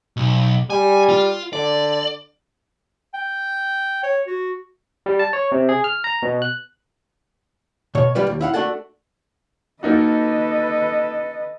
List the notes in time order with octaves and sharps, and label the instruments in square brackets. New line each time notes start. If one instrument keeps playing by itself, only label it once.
[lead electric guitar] B1
[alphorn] G3 [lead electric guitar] G#5
[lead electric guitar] F4
[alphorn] D3 [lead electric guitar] D5
[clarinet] G5
C#5
F#4
[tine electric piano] G3
A5
C#5
C3
G#4
F6
A#5
B2
F#6
[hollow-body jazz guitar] B2 C#5
B1 G3 F4 B4 D5
D#2
E4 F5 F#5
A3 D4 F#4 A4 F#5
[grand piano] A#3 D#4 F#4 [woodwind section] A4 [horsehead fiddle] B4 D#5